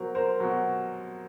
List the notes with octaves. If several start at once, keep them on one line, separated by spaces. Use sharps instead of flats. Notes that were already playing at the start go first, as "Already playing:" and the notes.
Already playing: B2 F#3 A#4 C5
A#4 C5
B2 F#3